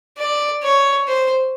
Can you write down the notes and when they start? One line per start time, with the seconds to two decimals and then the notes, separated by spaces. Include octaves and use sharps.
0.18 D5
0.63 C#5
1.08 C5